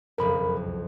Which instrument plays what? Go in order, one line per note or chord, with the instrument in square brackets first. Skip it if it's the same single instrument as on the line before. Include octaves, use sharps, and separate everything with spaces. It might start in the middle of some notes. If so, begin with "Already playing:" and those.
[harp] F#1 B1 F2 [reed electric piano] A#4 B5
[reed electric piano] C2